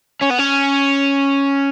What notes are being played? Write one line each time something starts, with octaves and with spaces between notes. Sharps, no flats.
C#4
B3
C#4